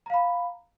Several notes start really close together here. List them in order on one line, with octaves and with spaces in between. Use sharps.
A#5 F5 B5